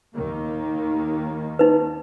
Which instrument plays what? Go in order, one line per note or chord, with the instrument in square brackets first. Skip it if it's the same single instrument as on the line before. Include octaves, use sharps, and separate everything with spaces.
[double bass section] D#2 D#3 A#3
[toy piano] D#4 B4